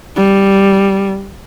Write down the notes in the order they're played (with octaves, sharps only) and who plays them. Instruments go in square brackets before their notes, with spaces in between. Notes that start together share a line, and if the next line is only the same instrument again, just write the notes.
[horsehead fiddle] G3